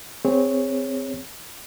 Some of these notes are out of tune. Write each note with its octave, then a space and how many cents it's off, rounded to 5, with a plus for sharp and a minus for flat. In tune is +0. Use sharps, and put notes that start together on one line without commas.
C4 -15 G#4 -20 C#5 +0